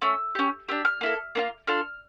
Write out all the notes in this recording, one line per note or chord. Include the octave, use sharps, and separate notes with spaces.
A3 C#4 E6
C#4 G4
D4 G4 E6
F6
A#3 E4 A4
A#3 D4 F4
D4 F4 A4 F6